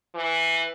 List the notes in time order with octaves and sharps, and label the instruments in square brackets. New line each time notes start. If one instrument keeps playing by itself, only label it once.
[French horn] E3